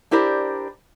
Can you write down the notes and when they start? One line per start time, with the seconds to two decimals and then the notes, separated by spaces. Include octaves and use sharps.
0.11 D4 E4 G4 A#4 C5 D5